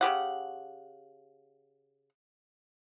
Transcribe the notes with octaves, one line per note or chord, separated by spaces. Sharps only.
C#3 B3 G4 F#5